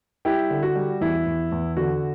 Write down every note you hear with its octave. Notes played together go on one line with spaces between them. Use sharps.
G3 E4 G4
D3
F#4
G3
E2 E4
E2
E2
D3 F#4